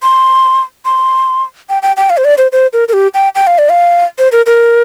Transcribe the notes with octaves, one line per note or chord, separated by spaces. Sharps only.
C6
C6
G5
G5
G5
F5
C5
D5
C5
C5
A#4
A#4
G4
G5
G5
F5
D5
F5
C5
A#4
A#4